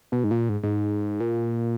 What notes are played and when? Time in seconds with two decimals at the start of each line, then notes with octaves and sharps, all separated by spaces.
0.12 B2
0.24 G#2
0.31 A#2
0.49 G#2
0.63 G#2
1.20 A#2